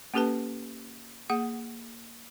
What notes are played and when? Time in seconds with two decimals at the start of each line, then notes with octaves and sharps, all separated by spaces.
0.14 A#3 C#4 G4 A4 B4 A5
1.30 A#3 G#4 F#5